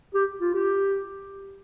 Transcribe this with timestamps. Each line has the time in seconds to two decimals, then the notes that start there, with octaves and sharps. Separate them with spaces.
0.15 G4
0.41 F4
0.54 G4